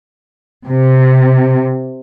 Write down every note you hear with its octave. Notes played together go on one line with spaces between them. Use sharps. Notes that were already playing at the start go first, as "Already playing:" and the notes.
C3